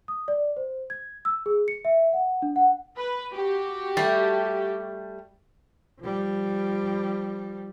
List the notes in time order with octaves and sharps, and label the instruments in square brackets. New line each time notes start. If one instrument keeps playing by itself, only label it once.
[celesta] D#6
D5
C5
G#6
E6
G#4
C#7
E5
F#5
D4
F#5
[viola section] B4
F#4 G4
[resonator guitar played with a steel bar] G3 A3
[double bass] F3 G3